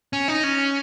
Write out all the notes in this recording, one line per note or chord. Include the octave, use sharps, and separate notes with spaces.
C#4
D#4
C#4